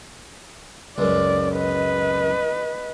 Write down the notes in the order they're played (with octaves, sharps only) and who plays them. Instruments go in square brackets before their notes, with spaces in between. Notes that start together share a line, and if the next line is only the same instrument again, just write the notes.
[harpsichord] C#2 F#2 [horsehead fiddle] D5
[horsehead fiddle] B4 D#5